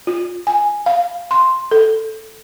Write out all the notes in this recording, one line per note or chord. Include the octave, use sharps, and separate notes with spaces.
F4
G#5
F5
C6
A4